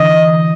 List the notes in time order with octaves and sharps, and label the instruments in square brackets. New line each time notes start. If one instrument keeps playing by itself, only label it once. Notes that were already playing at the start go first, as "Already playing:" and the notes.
Already playing: [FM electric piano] D3 E3 [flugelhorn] D#5